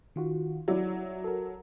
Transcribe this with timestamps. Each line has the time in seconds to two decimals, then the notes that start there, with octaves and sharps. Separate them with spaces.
0.16 D#3 F4 F#4
0.68 F#3 E4 D5 E5
1.24 A4 A#4